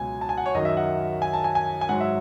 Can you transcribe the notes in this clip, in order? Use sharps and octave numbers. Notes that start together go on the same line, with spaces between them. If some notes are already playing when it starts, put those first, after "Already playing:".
Already playing: C#2 B2 F#3 G#5
A5
G#5
F#5
C#5
F#2 D#3 F#3 D#5
E5
F#5
G#5
A5
G#5
G#5
G#5
G#2 F#3 F#5
E5